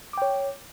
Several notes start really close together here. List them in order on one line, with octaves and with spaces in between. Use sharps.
D6 G5 C#5